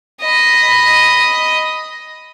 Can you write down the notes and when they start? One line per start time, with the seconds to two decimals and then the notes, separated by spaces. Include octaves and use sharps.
0.22 D#5 B5